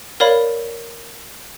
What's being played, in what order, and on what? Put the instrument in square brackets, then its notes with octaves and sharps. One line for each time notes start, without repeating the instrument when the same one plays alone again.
[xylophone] A#4 C#5 D5 F5 B5